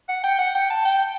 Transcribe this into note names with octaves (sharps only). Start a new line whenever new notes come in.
F#5
G5
F#5
G5
A5
G5